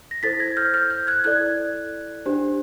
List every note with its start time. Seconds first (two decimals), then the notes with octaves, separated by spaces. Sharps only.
0.11 A#6
0.23 E4 A4 C5 A6 B6
0.39 G#6 A#6
0.57 F6 G6
0.74 F6 G6
0.90 F6 G6
1.07 F#6 G#6
1.24 E4 A4 D5 F#6 G#6
2.26 D4 G4 C5